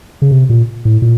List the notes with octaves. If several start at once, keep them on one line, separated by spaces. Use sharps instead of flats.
C#3
C3
A#2
A2
A#2